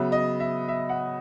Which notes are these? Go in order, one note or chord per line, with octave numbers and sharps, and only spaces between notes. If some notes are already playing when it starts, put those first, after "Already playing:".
Already playing: C#3 F#3 B3 E5
D#5
E5
E5
F#5